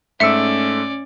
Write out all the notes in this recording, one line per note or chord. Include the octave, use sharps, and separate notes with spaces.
G#2 A3 C#4 D5 E5 E6 C#7